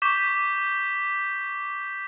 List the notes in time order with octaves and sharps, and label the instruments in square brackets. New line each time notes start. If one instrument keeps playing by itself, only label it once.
[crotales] C#6 D6 G6 B6 E7 G7